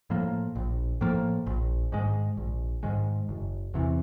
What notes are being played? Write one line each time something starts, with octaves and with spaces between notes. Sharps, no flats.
A2 F3 A#3
A#1
A2 F3 A#3
A#1
G#2 D#3 G#3
A#1
G#2 D#3 G#3
F#1
E2 C3 E3